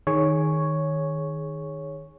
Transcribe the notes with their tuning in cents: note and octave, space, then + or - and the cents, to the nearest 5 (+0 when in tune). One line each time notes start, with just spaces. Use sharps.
D#3 +0 G#4 +0 C#5 +0